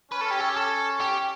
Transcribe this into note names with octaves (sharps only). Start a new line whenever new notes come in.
C#4 B4
A4
G4
A4
G4
A4
G4